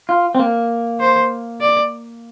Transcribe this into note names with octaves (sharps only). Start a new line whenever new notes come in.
F4
C4
A#3
C5
D5